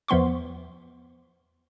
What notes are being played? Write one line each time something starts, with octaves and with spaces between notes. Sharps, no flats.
E2 F3 B3 C6 C#6